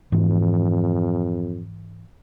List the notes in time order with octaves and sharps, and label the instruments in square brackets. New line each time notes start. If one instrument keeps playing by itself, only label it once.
[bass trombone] F2 [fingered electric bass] G#2 E3